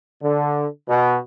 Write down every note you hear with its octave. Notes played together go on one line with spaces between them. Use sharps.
D3
B2